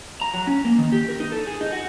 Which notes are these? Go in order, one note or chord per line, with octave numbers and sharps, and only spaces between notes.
A#5
F#3
C#4
A#3
D#3
G4
A#4
D#4
A4
G#4
D#4
F#4